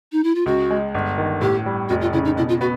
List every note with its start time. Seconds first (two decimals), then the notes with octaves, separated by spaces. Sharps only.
0.12 D#4
0.24 E4
0.35 F4
0.46 C#2 F#4
0.70 G#3
0.94 G1
1.18 D#3
1.41 A2 G4
1.66 G3
1.89 F1 F#4
2.01 F4
2.13 C#3 E4
2.25 D#4
2.37 B2 E4
2.49 F4
2.61 B3 F#4